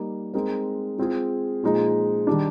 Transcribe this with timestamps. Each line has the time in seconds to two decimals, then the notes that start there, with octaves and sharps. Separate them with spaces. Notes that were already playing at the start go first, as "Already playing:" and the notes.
Already playing: G3 A#3 D#4 A#4
0.34 G#3 C4 D#4 A#4
0.99 G#3 C4 F4 G#4
1.63 A#2 F3 G#3 D#4 G#4
2.27 D#3 G3 D4